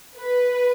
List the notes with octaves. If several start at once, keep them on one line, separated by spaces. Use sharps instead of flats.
B4